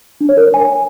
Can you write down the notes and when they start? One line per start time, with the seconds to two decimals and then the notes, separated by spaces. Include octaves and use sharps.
0.21 D4
0.29 C#5
0.37 A#4
0.46 C#5
0.54 G#5